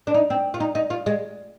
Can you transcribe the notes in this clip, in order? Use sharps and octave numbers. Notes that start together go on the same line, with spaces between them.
D4
D#4
C4
F4
D#4
D#4
F4
G#3